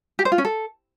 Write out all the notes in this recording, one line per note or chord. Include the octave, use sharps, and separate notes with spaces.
G4
C5
F4
C#4
A4